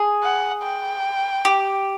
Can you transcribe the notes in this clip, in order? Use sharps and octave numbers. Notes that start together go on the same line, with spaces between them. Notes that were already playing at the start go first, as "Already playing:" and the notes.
Already playing: G#4
F#5
G5
G4